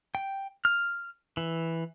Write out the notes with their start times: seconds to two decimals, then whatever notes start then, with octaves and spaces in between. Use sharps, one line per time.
0.15 G5
0.65 F6
1.37 E3